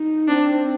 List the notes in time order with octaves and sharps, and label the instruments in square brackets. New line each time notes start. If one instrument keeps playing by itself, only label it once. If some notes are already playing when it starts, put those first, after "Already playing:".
Already playing: [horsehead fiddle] D#4
[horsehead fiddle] C4 [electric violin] D4